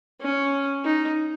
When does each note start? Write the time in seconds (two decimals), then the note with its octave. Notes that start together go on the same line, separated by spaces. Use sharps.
0.21 C#4
0.85 D#4